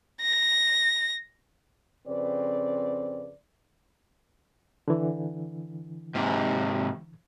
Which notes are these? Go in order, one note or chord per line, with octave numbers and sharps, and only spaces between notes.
A#6
F2 C#3 C4 B4 D5
D3 E3
G#2 C3